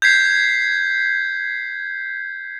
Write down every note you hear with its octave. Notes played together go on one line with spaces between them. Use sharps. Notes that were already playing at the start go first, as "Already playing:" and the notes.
G6 G#6 B6 C7